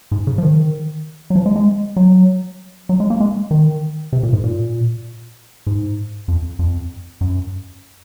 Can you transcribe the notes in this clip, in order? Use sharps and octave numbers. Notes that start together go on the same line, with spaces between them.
G#2
C#3
F3
D#3
F#3
F3
G#3
G#3
F#3
F#3
G#3
A#3
G#3
D#3
C3
A#2
G#2
A#2
G#2
F2
F2
F#2